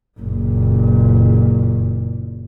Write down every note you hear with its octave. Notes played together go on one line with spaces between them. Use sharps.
F#1 A#2